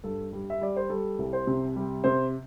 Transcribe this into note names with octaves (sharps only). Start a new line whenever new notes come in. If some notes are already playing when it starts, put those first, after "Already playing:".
G2 A4
G3
E5
G3 D5
C5
G3 A4
C2
C5
C3
G3
C3 C5